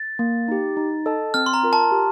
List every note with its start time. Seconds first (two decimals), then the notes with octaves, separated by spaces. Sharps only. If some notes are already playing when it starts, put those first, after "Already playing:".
Already playing: A6
0.19 A#3
0.48 D#4 G4
0.77 D#4
1.06 A4 D#5 A5
1.34 C4 F6
1.46 C6
1.54 A#5
1.63 F4 A#4
1.73 A5
1.92 G4